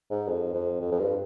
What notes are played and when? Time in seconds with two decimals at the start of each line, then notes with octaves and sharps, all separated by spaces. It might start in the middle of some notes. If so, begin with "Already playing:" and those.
0.10 G#2
0.28 F2
0.54 F2
0.81 F2
0.92 F2
0.99 G2